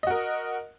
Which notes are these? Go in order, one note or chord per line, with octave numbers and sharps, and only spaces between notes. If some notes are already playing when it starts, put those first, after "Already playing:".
F#4 A#4 D#5